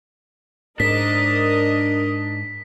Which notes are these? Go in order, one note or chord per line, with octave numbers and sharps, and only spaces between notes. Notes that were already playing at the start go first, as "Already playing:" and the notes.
G#2 D4 A#4 D#5 B6